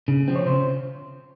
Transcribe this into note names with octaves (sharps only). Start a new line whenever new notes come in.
C#3
F3 C4
C#5
C#3 C5